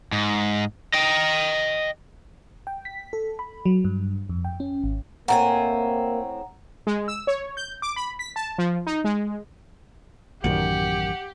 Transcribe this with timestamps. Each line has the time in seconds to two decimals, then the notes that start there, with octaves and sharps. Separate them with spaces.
0.12 G#2
0.93 D#5 G5
2.67 G5
2.85 B6
3.13 A4
3.39 B5
3.66 F#3
3.85 G2
4.29 F2
4.45 G5
4.60 C#4
4.84 G#1
5.28 A2 A#3 C4 F#5 G#5 A#5
6.87 G#3
7.08 E6
7.27 C#5
7.57 G6
7.82 D6
7.96 B5
8.19 B6
8.36 A5
8.58 F3
8.87 D#4
9.04 G#3
10.44 A1 F#2 D#3 G4 F#5